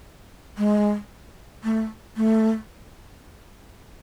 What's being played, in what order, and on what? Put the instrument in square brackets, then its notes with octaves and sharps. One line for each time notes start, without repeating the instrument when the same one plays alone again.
[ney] G#3
A3
A3